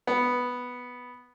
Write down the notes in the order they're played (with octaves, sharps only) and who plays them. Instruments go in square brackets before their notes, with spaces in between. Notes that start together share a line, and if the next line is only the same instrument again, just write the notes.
[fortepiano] B3